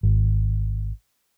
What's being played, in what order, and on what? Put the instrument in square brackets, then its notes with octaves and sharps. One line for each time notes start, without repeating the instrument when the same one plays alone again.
[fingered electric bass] G#1